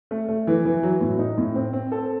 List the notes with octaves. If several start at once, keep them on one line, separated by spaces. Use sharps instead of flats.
A3
A3
E3
E3
F#3
A2
D#4
A2
C4
C4
A4